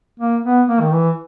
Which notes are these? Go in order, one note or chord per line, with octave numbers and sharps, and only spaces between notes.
A#3
B3
A#3
D#3
E3